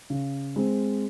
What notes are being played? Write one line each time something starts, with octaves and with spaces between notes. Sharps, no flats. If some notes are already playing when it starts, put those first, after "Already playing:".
C#3
G#3 C4